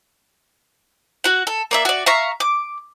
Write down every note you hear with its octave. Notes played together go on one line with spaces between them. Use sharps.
F#4 F#5
A4
A#3 D5 E5
F#4 D5
E5 F5 A#5 C#6
D6